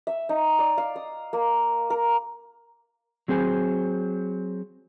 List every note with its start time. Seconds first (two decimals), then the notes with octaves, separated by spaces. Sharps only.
0.07 E5
0.29 D#4
0.59 D5
0.78 F5
0.96 D#6
1.33 A#3
1.90 A#4
3.28 F#3 C4 G#4 C5 G#5